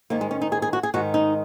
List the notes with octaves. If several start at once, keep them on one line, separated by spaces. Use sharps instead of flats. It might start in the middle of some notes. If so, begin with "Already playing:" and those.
G#2 D#3 A#3
G#3
C#4
D#4
G#4
G#4
F#4
G#4
G#2 D#3 F#4
D#4